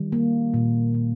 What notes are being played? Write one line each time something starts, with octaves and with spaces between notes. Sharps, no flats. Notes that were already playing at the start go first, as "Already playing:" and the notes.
Already playing: D#3 G3
A#3
A#2
A#2